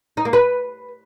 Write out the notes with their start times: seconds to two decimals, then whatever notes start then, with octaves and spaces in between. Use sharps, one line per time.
0.17 D#4
0.25 A#3
0.33 B4